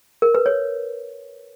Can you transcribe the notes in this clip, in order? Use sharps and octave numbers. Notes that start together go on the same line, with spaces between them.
A#4
B4
C#5